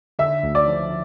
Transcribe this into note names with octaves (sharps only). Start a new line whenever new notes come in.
D3 E5
D2
D5
F3